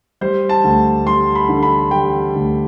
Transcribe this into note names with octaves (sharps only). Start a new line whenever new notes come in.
G3 C5
A5
D2
G3 C6
B5
D3
B5
G3 G5
D2